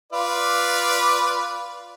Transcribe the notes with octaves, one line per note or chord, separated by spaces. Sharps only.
F4 B4 D5